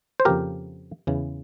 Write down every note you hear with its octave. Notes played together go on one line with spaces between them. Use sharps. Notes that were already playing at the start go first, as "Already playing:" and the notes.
C5
F2 C#3 F3 A#3 G4 A#4
E2 C#3 E3